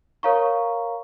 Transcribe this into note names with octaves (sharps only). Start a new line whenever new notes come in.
A#4 C#5 F5 A#5 C#6